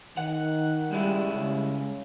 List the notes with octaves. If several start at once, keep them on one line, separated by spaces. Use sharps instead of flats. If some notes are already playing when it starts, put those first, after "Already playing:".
D#3 F#5
C#2 G3 G#3 E4
C#3